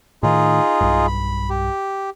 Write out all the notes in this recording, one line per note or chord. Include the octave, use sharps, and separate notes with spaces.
A2 D#3 D#4 F4 G#4
B1 G2
B5
G4